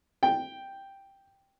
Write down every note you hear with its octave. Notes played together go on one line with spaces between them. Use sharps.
G5